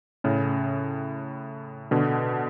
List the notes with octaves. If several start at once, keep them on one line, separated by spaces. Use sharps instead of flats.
A2 C#3
B2 D3